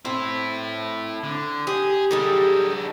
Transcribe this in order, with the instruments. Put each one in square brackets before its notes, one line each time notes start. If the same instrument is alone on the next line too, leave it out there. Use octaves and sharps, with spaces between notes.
[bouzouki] C4 [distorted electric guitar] E4 A4
[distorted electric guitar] D3
[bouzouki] G4 [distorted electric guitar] G#4
[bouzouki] D3 G3 G#4 [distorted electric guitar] D#4 A4